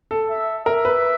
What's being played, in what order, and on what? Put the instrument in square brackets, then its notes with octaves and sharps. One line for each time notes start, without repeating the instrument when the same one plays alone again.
[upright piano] A4
[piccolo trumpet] E5
[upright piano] A#4 [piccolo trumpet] E5
[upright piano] B4